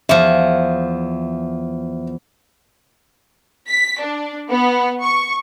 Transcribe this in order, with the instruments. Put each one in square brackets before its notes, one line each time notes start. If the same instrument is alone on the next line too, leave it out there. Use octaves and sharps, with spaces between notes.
[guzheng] E2 F3 [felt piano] E5
[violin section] B6
D4
B3
C#6